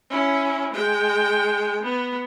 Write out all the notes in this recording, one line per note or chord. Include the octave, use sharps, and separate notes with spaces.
C#4 E4
G#3 G5
B3